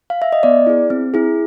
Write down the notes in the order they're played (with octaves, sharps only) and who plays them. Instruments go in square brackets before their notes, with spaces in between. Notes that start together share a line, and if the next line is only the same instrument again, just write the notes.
[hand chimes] F5
E5
D#5
B3 D5
E4 G#4
C4
E4 G#4